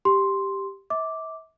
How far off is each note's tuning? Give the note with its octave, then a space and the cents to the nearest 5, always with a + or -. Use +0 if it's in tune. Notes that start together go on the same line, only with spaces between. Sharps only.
G4 +0 C6 +0
E5 -40 D6 -5